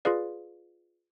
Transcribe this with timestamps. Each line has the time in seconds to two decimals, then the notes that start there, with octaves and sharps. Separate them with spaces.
0.05 F4 G#4 B4 D5 F5